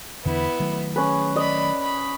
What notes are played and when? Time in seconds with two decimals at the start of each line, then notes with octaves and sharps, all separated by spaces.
0.25 E2 D3 B3 E4
0.60 D#3 F#3 A3
0.96 C#4 G#4 B4
1.36 D5 D#5 B5
1.82 B5